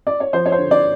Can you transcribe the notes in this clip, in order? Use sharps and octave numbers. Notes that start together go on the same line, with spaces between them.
D5
C#5
F3 C5
C#5
C5
D3
D5